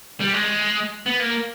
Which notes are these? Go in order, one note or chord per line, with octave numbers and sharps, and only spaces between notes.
G3
G#3
B3
A#3